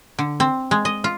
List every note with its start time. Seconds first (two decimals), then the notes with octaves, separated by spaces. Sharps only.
0.19 D3
0.40 C4
0.71 G#3
0.85 D#5
1.04 F4